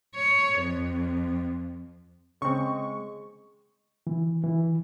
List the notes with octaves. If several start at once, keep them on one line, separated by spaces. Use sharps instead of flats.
C#5
F2
C#3 G#3 C4 C#6
E3
E3